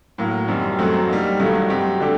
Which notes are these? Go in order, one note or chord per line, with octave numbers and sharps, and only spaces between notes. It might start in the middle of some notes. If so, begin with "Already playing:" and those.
A2 F#3 A#3
F#2 D#3 G3 C4
F#2 F#3 A3 C4 F#4
G3 A#3 D#4
G2 D#3 F#3 A3
F#3 C4 G4
D3 A3 D4 G4